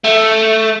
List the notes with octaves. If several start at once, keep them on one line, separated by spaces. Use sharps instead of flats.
A3